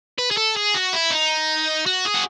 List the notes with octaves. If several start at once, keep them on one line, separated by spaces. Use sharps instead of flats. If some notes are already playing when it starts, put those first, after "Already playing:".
B4
G#4
A4
G#4
F#4
E4
D#4
F#4
G#4
F#4